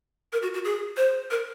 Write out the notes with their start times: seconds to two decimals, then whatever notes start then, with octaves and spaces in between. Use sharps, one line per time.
0.33 A#4
0.42 F#4
0.54 F#4
0.65 G#4
0.97 C5
1.31 A#4